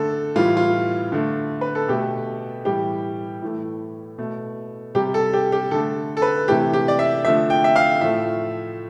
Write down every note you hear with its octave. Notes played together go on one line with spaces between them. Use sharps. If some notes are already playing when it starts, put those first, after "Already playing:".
Already playing: D3 A3 A4
A2 E3 G3 F4
F4
D3 A3
B4
A4
B2 A3 G4
A2 E3 G3 G4
A2 E3 A3
B2 A3
C3 G3 G4
A4
G4
G4
D3 A3 A4
A4
B4
C3 E3 A3 G4
G4
D5
E5
D3 F3 A3 E5
G5
E5
F5
A2 F3 A3 E5